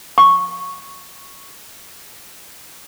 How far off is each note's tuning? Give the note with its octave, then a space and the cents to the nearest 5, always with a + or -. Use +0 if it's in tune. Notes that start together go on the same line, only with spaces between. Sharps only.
C#6 -5